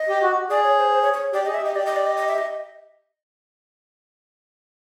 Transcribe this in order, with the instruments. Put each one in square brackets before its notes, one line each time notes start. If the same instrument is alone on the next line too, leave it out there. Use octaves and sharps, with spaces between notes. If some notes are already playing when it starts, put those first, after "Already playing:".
Already playing: [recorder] D#5
[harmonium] G4
F#4
[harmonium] G#4 [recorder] D5
[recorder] C#5
C5
C5
C#5
C#5
[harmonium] G4 [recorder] D5
[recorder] D#5
[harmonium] G#4
[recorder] E5
[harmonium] G4 [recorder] D#5
[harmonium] G4 [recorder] D5
[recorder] D#5
D5
D#5
D#5
E5
D#5